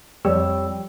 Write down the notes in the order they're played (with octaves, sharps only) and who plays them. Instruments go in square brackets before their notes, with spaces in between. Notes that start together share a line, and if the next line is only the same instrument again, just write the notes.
[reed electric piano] F2 G3 C#5 G5 E6